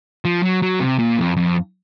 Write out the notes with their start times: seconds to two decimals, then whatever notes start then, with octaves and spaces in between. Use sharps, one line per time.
0.25 F3
0.43 F#3
0.62 F#3
0.80 C3
0.99 A#2
1.18 F2
1.37 F2